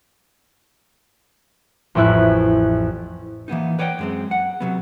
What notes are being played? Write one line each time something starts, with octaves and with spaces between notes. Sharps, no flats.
A1 F2 A2 E4 F#6
E3 A#3 B3 D#4
B4 C#5 D5 F#5 G5
F#2 G#3 C4
F#5
C3 F#3 B3